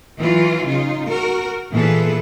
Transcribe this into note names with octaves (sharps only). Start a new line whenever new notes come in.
E3 F#3 F4
C#3 D#4 F4
F#4 A#4
A#2 E3 B3 G#4 A4 B4